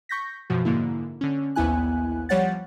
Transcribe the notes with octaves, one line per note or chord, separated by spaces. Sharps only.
C#6 G6 A#6 B6
F#2 B2 F3 F#4
G#2 D3 A#3 E4
D3 C#4
A#1 D#2 B3 E4 G#5 F#6
F3 G3 C#5 F#5 A6